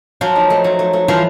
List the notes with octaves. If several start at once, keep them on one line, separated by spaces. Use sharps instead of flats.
F3 F#3
D#4
A3
F#3
A3
A3
E3 F3